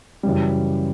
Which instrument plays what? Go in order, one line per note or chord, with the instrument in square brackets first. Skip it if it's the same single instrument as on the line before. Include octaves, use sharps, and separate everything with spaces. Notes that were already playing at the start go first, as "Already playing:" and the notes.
[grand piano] F#2 C#3 E3 G3